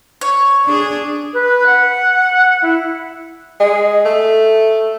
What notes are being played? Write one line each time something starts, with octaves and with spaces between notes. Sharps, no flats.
C#5
D4 G#4
B4
F#5
E4
G#3
A3